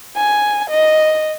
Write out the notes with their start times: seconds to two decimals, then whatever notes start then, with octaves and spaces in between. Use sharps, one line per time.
0.16 G#5
0.70 D#5